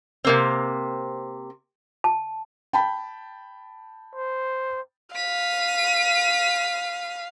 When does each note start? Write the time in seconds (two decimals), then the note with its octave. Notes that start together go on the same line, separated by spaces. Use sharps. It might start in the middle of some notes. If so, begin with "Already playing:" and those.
0.25 C3 A#3 C4
2.04 A5
2.73 G5 A5 B5
4.15 C5
5.16 F5 B6 D#7